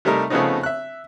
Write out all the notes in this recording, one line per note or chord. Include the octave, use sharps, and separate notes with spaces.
C3 G3 A3 D#4 A#4
C#3 F3 A3 B3 C4 D#4
E5 F#6